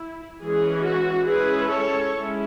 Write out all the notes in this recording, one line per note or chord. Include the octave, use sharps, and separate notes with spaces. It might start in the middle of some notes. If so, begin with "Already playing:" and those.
Already playing: E4
E3 G#3 C#4 G#4
F#4
G#3 C#4 E4 G#4 B4
A4 C#5
G#3 C#4 E4